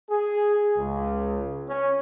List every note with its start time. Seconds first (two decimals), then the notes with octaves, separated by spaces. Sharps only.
0.10 G#4
0.78 C#2
1.68 C#4